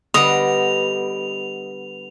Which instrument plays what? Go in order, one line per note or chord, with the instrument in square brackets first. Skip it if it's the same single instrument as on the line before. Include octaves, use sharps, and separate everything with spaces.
[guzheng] D3 G3 B3 [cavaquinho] D#5 [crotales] F7